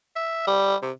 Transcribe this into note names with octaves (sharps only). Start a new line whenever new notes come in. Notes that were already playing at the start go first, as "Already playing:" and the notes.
E5
G3
C3